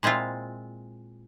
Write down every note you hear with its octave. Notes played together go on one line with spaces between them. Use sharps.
A#2 G#3 C4 E4 F4